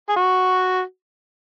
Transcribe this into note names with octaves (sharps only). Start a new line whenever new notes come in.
G#4
F#4